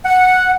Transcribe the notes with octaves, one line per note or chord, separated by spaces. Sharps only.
F#5